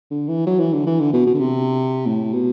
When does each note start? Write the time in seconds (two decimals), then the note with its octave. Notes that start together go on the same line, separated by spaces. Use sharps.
0.11 D3
0.28 E3
0.47 F#3
0.60 E3
0.73 D3
0.87 E3
1.00 D3
1.13 B2
1.27 B2
1.34 D3
1.40 C3
2.07 A2
2.33 B2